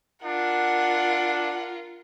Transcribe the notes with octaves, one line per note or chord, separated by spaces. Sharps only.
D4 F4 A#4 F#5